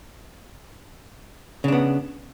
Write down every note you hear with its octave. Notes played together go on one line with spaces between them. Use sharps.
C#3 B3 D4